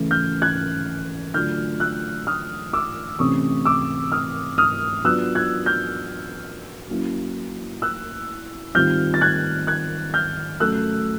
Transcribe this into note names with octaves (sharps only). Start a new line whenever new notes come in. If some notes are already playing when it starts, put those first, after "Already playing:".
Already playing: C#3 E3 A3
F6 G6
F#6 G#6
D3 F#3 A3 D4 F4 F6 G6
E6 F#6
D#6 F6
D6 E6
C3 E3 A3 C#4 C#6 D#6
D6 E6
D#6 F6
D#6 F6
F#3 B3 D4 F4 E6 F#6
F#6 G#6
F6 G6
F#3 A#3 C#4 E4
E6 F#6
D#3 G3 C4 F4 F6 G6
A6
F#6 G#6
F#6 G#6
F6 G6
F#3 A3 C#4 E6 F#6